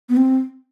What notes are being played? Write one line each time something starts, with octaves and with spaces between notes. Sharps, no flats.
B3
C4